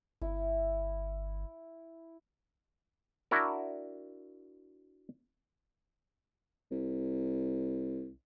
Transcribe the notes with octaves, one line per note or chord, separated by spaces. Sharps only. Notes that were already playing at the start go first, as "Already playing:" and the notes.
G1 E4
D4 E4 F#4 A#4
C2